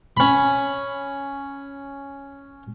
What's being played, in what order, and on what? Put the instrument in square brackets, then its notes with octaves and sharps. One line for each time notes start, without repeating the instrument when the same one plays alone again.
[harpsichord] C#4 B5